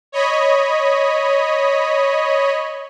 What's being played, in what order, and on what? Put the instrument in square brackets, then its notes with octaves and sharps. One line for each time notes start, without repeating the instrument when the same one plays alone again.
[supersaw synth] C#5 D#5 B5